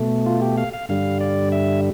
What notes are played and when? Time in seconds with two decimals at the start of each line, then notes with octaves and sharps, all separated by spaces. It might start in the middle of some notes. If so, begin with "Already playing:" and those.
Already playing: B2 A3
0.26 F4
0.42 G4
0.58 F5
0.73 F5
0.89 G2 D3 G3 F5
1.21 D5
1.52 E5